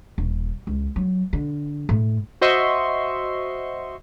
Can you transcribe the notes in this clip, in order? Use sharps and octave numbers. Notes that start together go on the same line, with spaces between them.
D#1
C#2
F#3
D3
A2
F#4 C5 D#5 E5 C6 C#6